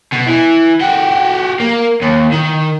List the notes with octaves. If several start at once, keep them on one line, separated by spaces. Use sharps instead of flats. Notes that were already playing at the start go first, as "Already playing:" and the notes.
B2
E3
F#4 G4
A#3
D#2
D#3